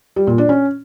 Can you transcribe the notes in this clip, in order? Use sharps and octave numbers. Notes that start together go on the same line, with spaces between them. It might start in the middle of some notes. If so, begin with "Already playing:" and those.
G3
A#2
D4
C#4